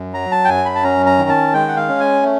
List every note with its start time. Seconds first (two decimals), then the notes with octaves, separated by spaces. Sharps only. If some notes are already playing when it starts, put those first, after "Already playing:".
Already playing: F#2
0.13 F#3 A#5
0.32 A5
0.45 G5
0.48 F#2 G#5
0.65 B5
0.75 A5
0.83 C#4 A#5
1.06 A#5
1.18 D#3
1.29 A5
1.53 G#3 G5
1.68 F#5
1.76 F5
1.88 C#4
2.00 G#5
2.23 A3